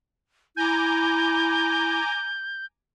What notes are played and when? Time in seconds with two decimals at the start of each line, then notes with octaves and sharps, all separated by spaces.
0.57 E4 G#5 A#5 D6 G6